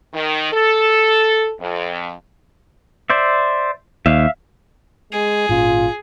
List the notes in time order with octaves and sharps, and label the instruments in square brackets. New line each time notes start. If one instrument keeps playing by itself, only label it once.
[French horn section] D#3
A4
F2
[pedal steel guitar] C5 D5 E5
[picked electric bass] D#2 [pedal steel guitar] E5 F5
[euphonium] G#3 [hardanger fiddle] G#4
[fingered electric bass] G#1 A#2 C#4 [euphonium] F4